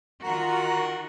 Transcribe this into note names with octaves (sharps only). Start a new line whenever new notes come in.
D#3 F4 F#4 A#4 F#5 A#5